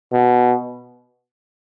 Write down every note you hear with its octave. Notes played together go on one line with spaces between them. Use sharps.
B2